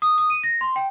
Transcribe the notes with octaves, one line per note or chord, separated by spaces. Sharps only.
D#6
D#6
D#7
A#6
C6
G5